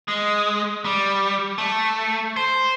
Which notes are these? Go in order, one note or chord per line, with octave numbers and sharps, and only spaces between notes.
G#3
G3
A3
C5